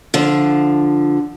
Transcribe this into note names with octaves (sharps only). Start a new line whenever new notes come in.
D3 F3